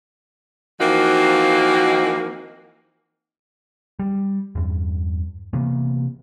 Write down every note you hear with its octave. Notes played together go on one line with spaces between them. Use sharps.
E3 F3 A#3 C4 D#4 F#4
G3
E2 G2
C3 E3 A#3 B3